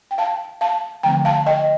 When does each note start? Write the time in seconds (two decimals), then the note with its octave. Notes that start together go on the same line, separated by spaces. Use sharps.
0.11 G5
0.18 F5 A5
0.61 F5 A5
1.03 D3 F3 A3 C4 G5 A#5
1.25 F5 A5
1.46 D#5 G5